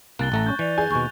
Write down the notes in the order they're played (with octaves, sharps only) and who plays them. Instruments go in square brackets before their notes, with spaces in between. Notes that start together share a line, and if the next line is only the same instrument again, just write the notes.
[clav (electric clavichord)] C2 A#3 [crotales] F#6 A6 G7
[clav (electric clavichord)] A1 A3 A#5
[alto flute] C#4 [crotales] C#6 G6 G7
[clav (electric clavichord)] E3 [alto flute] D5 [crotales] D#7 F7
[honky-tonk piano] G#4 G#5 [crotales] G6
[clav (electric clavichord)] D#2 B2 [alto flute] C#6